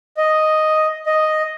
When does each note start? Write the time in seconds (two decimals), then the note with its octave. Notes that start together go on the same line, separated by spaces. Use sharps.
0.17 D#5
1.06 D#5